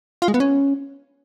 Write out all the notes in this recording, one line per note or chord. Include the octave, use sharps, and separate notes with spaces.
F4
G#3
B3
C#4